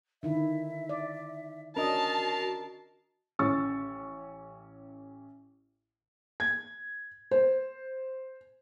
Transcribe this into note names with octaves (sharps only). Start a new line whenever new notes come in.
D3 D#3 E4 E5
D5
C#4 D4 F#4 A#4 D#5 A5 C7
A1 C#4 C#6 E6 A6
G#6
C5